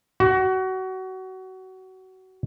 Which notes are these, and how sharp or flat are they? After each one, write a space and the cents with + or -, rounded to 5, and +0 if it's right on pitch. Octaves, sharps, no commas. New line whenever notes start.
F#4 +25